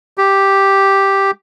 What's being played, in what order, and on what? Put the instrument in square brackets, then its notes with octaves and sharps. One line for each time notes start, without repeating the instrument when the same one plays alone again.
[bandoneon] G4